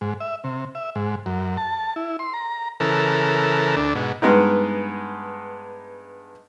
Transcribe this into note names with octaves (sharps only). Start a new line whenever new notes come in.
G#2
E5
C3
E5
G#2
F#2
A5
E4
C6
A#5
C#3 E3 A4 A#4
D2 D4
G#2 B2
G2 G#3 B3 D#4